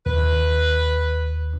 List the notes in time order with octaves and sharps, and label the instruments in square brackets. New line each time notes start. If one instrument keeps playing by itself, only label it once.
[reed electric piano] D#2 [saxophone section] B4